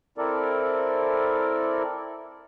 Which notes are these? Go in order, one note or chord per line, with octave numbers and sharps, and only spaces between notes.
C4 E4 A4 A#4 D5